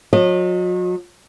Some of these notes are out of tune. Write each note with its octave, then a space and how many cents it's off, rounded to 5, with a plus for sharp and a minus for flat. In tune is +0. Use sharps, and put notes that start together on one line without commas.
F#3 -40 D#5 -25